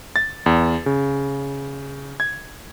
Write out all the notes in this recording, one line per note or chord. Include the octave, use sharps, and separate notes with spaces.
A6
E2
C#3
G#6